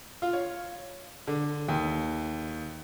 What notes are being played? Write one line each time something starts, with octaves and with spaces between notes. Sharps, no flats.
F4
C#5
D3
D#2